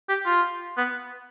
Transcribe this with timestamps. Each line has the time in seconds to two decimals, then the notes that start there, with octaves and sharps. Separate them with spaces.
0.09 G4
0.26 F4
0.77 B3